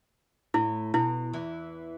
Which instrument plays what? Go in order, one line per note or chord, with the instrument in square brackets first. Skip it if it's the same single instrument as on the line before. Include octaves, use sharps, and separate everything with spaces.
[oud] A2 [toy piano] E4
[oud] B2 [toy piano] E4
[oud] E2 E3